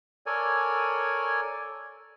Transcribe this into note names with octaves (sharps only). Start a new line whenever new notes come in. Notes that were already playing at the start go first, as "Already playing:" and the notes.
A4 A#4 C#5 D5 G#5